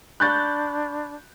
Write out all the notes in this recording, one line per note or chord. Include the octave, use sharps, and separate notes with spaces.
D4 B5 C#6 F#6 G6 A6